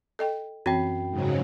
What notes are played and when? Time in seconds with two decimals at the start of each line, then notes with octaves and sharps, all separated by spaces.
0.19 A4 D#5 G5
0.66 F#2 E3 C4 F#4 G5 B5
1.11 G#2 C#3 F#3